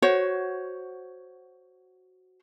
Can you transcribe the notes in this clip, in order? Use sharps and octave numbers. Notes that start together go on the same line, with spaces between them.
F#4 C5 C#5